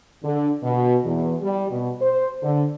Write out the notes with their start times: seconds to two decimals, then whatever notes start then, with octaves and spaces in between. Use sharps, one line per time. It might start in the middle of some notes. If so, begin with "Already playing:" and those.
0.23 D3
0.63 B2
1.05 E2
1.42 G3
1.70 B2
2.01 C5
2.43 D3